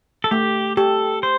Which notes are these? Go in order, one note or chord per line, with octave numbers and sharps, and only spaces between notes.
A4
A3 G4
G4 A4
C5